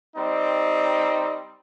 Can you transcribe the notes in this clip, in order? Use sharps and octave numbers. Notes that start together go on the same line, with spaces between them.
G3 C4 D#4